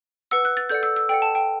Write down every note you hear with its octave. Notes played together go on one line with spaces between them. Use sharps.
B4 F#5 E6
F#6
A6
A4 D5 F#5 G6
E6
E6
A4 D5 F#5 G5
A5
G5